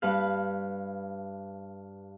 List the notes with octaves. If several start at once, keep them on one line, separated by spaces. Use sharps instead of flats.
G2 B4 F5